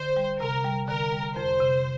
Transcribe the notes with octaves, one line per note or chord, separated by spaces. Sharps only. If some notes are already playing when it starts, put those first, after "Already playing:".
Already playing: D3 C5
G3
C3 A#4
G3
D3 A#4
G3
F2 C5
C3